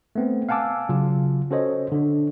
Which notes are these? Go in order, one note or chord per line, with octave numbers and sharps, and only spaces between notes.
A3 B3 C4
F5 F#5 G#5 A5 D6 E6
C#3 F#3 F4
C#4 F#4 A4 C5 C#5 D#5
D3 D4